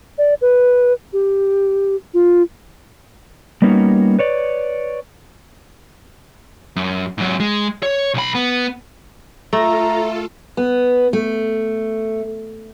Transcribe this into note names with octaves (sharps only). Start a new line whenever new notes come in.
D5
B4
G4
F4
G3 A#3 B3 C#4 D#4 F#4
B4 C#5 D5
F#2
G#2 F#3
G#3
C#5
B1 B5
B3
A3 F4 A4 E5 A#5
B3
A3